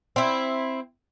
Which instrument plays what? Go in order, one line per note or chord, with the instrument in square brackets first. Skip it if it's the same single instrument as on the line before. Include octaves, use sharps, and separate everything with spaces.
[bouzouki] C4 E4